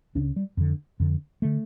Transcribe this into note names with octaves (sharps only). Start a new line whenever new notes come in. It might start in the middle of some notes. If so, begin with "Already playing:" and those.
C#2 C#3 D4
G3
F2 D3
F2 D3
D3 A3